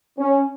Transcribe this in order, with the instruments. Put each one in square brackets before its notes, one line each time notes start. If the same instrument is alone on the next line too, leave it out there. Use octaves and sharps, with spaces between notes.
[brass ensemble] C#4